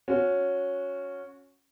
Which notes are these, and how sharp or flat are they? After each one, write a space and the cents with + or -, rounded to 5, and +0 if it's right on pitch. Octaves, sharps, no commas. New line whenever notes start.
C#4 +0 F#4 -25